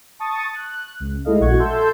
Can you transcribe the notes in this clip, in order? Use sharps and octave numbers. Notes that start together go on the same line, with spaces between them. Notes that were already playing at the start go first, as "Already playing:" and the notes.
A5 C#6 D#6 A6
F#6
C#2
G#3 A3 E4 A4 D#5 F5
A#1 F#4 F#5 C#6 G#6
A4 E5 A5 C6 E6 G6